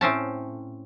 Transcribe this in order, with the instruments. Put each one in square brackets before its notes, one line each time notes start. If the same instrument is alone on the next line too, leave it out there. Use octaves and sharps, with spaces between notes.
[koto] A2 C4 C#4 A5